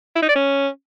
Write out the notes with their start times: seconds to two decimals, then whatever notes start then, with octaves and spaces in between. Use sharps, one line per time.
0.16 E4
0.22 D#4
0.29 D5
0.35 C#4